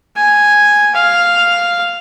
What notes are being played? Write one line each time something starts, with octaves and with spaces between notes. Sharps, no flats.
G#5
F5